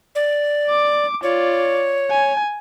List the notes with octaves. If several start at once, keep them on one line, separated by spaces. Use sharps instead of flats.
D5
D6
F4 C#5 D5
G#5